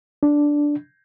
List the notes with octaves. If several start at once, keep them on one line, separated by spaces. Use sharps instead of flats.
D4